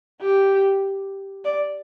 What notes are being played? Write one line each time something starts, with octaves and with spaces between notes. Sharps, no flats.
G4
D5